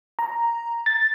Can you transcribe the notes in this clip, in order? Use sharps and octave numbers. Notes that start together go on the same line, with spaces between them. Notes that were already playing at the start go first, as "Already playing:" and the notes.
A#5
A6